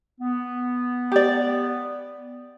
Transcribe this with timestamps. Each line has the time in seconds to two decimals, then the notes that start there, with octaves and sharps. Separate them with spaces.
0.20 B3
1.12 G4 D5